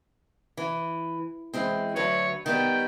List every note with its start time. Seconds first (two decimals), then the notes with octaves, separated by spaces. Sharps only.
0.57 E3
1.54 E3 G#3 C4
1.96 D2 F#3 B4 C#5
2.46 D#3 G3 B3 G5